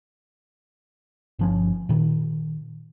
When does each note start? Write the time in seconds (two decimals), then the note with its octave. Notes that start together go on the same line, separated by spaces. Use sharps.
1.39 G1 F3 C#4
1.89 A#2 D#3